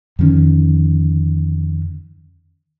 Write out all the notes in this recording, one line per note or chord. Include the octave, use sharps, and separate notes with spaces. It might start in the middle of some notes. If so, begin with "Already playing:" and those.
F2 D3 D#3 C#4